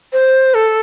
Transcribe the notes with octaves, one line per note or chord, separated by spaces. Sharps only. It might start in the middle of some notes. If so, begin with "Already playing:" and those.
C5
A4